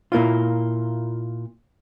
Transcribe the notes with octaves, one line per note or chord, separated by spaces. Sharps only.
A#2 A#3 E4 F4